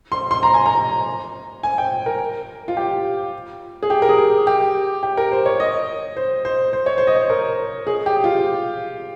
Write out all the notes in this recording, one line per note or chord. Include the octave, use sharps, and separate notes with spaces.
C6
C6
A#5
G#5
A#5
G#5
G5
A#4
F4
G4
G#4
G4
A#4
G#4
G4
G4
A#4
C5
C#5
D#5
C5
C5
C5
C#5
C5
D#5
C#5
C5
A#4
G#4
G4
F4